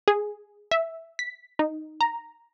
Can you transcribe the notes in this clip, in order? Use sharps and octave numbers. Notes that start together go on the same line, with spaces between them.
G#4
E5
B6
D#4
A#5